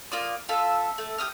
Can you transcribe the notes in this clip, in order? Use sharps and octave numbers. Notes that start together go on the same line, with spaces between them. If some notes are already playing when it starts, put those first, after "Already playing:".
A#3 F4 D5 D#6
F4 A4 E5 F5
A3
G4 B4 D#6 F6